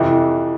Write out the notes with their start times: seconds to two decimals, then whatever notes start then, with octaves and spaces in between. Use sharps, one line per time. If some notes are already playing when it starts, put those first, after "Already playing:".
Already playing: F2 C3 E3